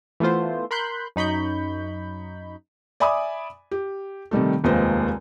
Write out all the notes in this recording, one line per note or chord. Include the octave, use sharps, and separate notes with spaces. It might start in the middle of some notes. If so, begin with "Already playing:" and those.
E3 A3 B3 F4 C5
A#4 B5 C6 F#6 G6
F#2 D#4 B5 C#6 G6
D5 E5 G#5 B5 D6 D#6
G4
C3 D#3 G3 A3
F1 D#2 G#3 F4 B4 C5